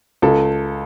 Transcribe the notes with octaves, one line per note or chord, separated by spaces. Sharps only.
C#2 A4